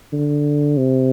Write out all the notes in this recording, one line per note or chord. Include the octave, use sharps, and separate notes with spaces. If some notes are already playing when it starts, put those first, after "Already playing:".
D3
C3